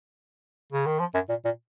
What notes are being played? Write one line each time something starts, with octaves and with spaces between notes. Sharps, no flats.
C#3
D#3
F3
F#2
A#2
A#2